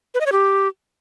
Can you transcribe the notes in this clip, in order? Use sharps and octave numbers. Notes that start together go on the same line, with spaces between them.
B4
D#5
C#5
G4